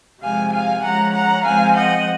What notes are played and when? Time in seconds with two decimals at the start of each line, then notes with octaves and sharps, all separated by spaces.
0.22 C3 F3 G#3 F5 G#5
0.52 F5 G#5
0.83 F3 G#3 C#4 F#5 A#5
1.14 F#5 A#5
1.45 F3 G#3 C4 F5 G#5
1.76 D#5 F#5